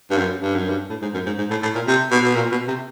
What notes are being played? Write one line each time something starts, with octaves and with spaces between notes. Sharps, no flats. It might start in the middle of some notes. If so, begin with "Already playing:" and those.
G2
F#2
G2
F#2
G2
A2
G#2
F#2
G#2
G#2
A2
A2
A#2
C3
B2
B2
A#2
B2
C3